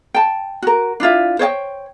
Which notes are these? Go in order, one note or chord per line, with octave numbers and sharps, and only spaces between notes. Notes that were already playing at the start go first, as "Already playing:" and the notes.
G5 A5
F#4 A#4
D4 E4 F4 E5
C5 C#5 D#5 G5